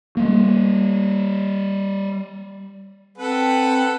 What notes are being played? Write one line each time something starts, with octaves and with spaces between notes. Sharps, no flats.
G3 A#3
C4 A4 B4 F#5